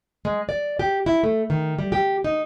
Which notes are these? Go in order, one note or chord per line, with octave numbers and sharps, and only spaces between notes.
G#3
D5
G4
E4
A3
D#3
G3
G4
D#4